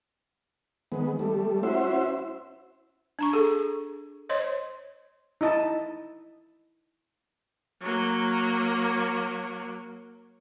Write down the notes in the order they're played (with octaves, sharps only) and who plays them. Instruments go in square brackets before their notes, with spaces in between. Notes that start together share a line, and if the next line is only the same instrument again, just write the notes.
[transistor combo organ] D#3 G#3 B3
G3 A3
C#4 E4 F#4 C5 E5
[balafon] D4 A#5 C#6
D4 G#4 A4
C5 C#5 D#5 C6
[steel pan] D#4 E4 D#5 A5
[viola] F#3 A#3